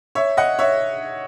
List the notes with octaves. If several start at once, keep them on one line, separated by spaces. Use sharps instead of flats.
C#5 E5
D#5 F#5
C#5 E5